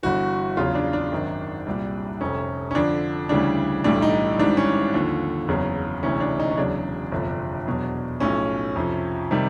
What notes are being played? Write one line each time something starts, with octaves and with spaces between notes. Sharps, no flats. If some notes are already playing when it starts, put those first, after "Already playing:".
G1 G2 E3 F#4
E2 C#3 F#3 F4
D4
D4
G#1 F#2 D#3
C2 A#2 G3
F1 F2 C3 C#4
C#4
F2 D3 F3 D4
D2 C#3 E3 G3 D4
B1 A2 E3 G3 D4
D#4
G#1 G#2 E3 G3 D4
C#4
D#2 D3 F3
F#1 E2 C#3 F#3
E1 D2 C3 E3 C#4
D4
D#4
C#4
E1 E2 C#3 F#3 D4
G1 F2 C3 F3
E2 B2 F#3
B1 A2 F3 C#4
F2 C3 F3
C3 D#3 G3